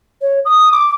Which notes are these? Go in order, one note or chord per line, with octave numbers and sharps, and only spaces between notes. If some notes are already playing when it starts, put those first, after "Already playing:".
C#5
D#6
D6